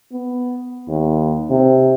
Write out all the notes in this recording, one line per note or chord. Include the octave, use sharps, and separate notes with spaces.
B3
D#2
C3